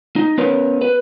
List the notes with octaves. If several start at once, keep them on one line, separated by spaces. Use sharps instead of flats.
D#4
B3 C#4 A#4 B4 C#5
B4